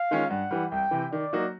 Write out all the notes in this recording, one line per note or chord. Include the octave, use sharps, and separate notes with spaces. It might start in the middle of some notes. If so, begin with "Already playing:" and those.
Already playing: F5
D#3 G#3 C#4 F4
G2 F#5
E3 G3
C2 G5
C3 E3
D#3 D5
F#3 A#3 D#4 F#4